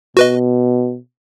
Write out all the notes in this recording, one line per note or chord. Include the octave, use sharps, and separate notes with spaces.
B2 F#4 B4 D#5